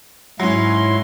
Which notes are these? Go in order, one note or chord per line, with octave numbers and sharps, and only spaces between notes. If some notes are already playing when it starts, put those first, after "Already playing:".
G#2 F#3 C#4 E4 C6